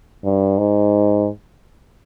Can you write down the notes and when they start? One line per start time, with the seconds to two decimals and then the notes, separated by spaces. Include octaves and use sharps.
0.24 G2
0.58 G#2